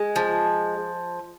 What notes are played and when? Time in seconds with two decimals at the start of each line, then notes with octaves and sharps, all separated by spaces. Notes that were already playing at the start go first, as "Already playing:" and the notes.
Already playing: G#3
0.16 F3